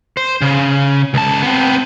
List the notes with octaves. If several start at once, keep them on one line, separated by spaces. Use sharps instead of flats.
C5
C#3
C#2 A5
B3 C4